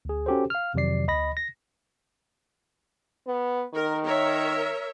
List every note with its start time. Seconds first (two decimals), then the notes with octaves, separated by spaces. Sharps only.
0.05 D2 G#4
0.26 C#4 F#4 G4 A4 C5
0.50 F5 F6
0.74 F2 C3 D#3 F#3 D5 C7
1.08 D2 D#5 B5 A#6
1.37 A#6
3.27 B3
3.74 D#3 A#4
4.05 A#4 C#5 E5